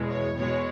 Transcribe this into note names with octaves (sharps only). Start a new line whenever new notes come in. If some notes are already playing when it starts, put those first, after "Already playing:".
Already playing: E2 B2 G#3
C#5
B2 G#3 C#5